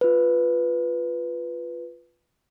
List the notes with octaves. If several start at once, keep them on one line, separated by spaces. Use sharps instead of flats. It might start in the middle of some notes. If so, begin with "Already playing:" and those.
F4 B4